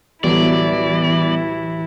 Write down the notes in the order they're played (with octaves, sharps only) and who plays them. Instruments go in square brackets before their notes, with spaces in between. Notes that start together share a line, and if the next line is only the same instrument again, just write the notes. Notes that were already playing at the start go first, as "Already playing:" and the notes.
[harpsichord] A1 D2 F#3 [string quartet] E3 E4 [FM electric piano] G3 B3 [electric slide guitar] D5